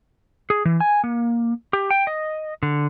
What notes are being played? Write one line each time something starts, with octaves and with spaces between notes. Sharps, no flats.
G#4
E3
G#5
A#3
G4
G5
D#5
D3